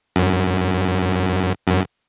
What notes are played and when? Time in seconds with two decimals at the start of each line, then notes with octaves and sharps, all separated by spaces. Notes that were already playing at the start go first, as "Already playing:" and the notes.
0.16 F#2
1.67 F#2